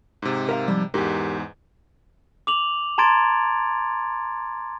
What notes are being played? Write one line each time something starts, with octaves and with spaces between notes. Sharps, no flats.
G#2 C3
A#4 E5 F5
F3 G3
E2 G#2 G4 A#4
D6 F7 F#7
A5 A#5 C6 G#6 A6 D7